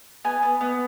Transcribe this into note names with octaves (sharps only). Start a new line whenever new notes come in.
B3 G#5
B3
B3